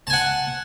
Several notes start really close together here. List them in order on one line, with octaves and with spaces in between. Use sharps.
A5 G#5 F#5